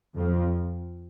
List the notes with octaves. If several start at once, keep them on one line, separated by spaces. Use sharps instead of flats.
F2 F3 C4